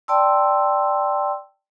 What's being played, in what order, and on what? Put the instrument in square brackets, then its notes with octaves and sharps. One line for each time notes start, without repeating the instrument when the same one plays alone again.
[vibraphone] D5 G5 A5 C6 E6